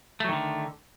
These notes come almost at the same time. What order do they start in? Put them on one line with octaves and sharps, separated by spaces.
A3 F#3 D#3 D3